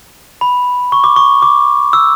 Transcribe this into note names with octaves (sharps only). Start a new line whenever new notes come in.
B5
C#6
D6
C#6
D6
E6